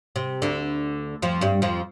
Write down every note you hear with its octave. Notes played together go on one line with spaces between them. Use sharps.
C3
D2 D3
F2 F3
G2 G3
F2 F3